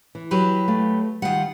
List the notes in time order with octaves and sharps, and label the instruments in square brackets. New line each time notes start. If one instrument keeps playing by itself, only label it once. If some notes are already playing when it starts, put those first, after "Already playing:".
[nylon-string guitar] E3
[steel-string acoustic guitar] F#3 G4 B4
[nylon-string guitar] A3 F5
[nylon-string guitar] D#3 G3 [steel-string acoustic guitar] F4 F#5